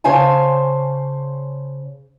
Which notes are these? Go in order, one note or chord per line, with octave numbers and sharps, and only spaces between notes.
C#3 C5 C#5 F5 G#5 A5